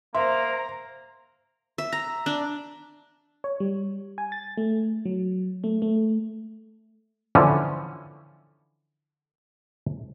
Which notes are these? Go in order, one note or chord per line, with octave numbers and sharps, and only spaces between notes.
A#3 C5 E5 A#5 C6
E5
A#5
D4
C#5
G3
G#5
A6
A3
F#3
A3
A3
D3 E3 F3 C#4